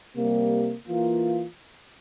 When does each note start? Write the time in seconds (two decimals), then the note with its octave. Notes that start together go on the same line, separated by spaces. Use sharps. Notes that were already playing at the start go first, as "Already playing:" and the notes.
0.16 C3 G3 A#3
0.87 E3 A#3 F4